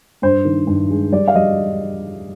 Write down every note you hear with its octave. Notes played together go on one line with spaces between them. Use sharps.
G2 C5
D#3
G2
G#3
G3 D5
F5
G3 D#5